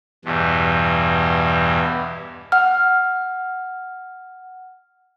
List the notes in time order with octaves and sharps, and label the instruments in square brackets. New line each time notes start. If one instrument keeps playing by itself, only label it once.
[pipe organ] E2 G2 B2
[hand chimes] F#5 F6